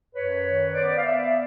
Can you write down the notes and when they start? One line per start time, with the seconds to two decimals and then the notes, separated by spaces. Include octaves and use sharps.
0.15 F#2 B4 C#5
0.46 D#3
0.74 B3 C5 D5
0.97 F5
1.04 B3 D5 E5